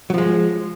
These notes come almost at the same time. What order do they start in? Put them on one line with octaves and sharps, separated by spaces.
F#3 F3 G#3